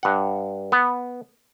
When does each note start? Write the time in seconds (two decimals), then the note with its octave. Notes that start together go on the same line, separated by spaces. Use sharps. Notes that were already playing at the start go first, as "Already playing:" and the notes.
0.03 G2 F#5
0.72 B3